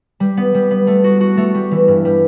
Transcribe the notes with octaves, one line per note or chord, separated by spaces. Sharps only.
G3
B3
G3
B3
A3
F#4
F#4
A3
G3
E3
G2
G3